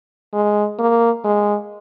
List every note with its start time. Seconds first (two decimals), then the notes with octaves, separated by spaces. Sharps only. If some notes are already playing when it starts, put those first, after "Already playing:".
0.34 G#3
0.79 A#3
1.25 G#3